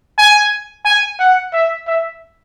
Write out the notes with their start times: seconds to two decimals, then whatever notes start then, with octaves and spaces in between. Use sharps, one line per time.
0.18 G#5
0.85 G#5
1.19 F#5
1.53 E5
1.87 E5